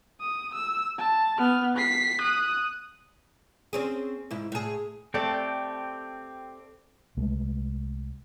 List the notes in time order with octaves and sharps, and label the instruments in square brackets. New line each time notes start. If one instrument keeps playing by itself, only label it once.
[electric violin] D#6
E6
A5
B3 F6
B6 C7
D#6 F#6
[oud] C4 C#4 G#4
G#2 E4
A2 G#4
[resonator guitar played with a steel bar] A3 A4 D5 [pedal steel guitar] C4 G4
[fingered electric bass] C2 G#3 A3